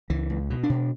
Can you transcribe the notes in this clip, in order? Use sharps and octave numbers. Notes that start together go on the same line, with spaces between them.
C#2 E3
C#2
B2
D4
B2